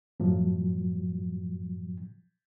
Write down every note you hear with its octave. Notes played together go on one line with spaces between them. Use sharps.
F#2 A2 F3 F#3